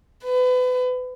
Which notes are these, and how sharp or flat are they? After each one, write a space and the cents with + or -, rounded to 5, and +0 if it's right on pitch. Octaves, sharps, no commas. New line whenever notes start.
B4 +30